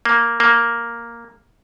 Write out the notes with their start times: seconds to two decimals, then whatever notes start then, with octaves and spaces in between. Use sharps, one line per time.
0.05 A#3
0.40 A#3